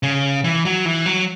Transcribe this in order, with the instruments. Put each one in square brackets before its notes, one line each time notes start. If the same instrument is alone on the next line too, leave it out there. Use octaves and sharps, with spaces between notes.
[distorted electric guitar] C#3
E3
F#3
E3
F#3